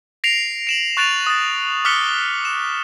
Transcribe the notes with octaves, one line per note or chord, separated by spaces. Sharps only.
A#6 C7 D7 F7
D7 E7 F#7
C#6 F#6 A6 D7 E7 F7
D#6 A6
D6 F6 F#6 B6 C#7 G7
E7